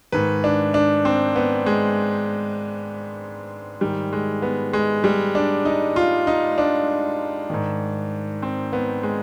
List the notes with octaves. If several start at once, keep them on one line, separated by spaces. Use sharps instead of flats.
G#2 D#3 B4
D4
D4
C4
B3
G#3
G#2 D#3 G3
G#3
B3
G#3
G3
D4
D#4
F4
D#4
D4
G#2 D#3
C4
B3
G#3